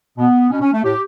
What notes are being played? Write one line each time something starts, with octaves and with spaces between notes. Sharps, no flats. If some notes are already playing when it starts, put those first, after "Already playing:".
B2 B3
B2 C#4
C#4
A3
A2 G4